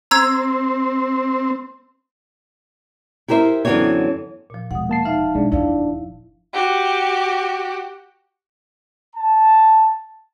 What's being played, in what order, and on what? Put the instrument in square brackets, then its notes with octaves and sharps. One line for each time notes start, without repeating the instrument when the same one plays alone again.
[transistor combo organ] C4 [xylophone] A#5 E6 G#6
[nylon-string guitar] E4 G4 A#4 C5 E5
F#2 D3 E3 B3 C4 C#5
[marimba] A#2 F3
[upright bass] E1 [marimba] F#5 D#6
[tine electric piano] A#3 A5 C7
[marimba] D#4 E5 [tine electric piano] F5 A5
[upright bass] B2 [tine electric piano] G#3 D4
[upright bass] F#1 E2 [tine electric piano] D4 [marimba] E4 F5
[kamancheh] F#4 G4
[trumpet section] A5